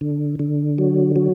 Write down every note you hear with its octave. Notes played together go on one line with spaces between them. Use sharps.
D3
D3
F#3
F#3